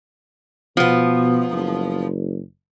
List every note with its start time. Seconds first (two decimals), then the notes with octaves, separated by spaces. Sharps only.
0.77 B2 F3 B3
1.52 F#1